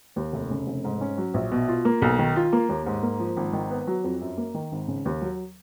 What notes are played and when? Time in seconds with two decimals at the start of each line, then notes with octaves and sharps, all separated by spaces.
0.16 D#2
0.33 F1
0.51 C#3
0.67 F1
0.84 G#2
1.01 C#4
1.18 F#3
1.34 A#1
1.51 B2
1.68 F4
1.85 A#3
2.02 B1
2.19 D#3
2.36 F4
2.53 A#3
2.69 D#2
2.86 G#2
3.03 A#3
3.20 F3
3.37 G#1
3.53 D#3
3.70 B3
3.87 F#3
4.04 F2
4.21 F#2
4.37 A#3
4.54 D#3
4.72 G#1
4.88 C#3
5.05 D#2
5.22 F#3